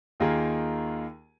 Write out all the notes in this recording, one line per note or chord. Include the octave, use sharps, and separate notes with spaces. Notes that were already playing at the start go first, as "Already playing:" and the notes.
D#2 D#3 A#3 F4 G#4